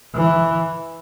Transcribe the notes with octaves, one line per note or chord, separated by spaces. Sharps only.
E3